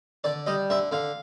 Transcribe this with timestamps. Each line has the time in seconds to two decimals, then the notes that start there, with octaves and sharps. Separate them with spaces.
0.24 D3 D5
0.46 G3 D#5
0.70 D3 E5
0.91 D3 F5